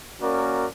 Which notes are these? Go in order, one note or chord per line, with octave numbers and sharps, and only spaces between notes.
A#3 C#4 F#4 A#4 D5